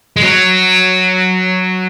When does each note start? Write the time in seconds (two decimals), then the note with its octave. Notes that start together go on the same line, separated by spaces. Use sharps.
0.17 G#3
0.22 F#3